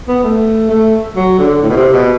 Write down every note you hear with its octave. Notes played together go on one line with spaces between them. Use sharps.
B3
A3
A3
F#3
D3
A2
B2
C3
B2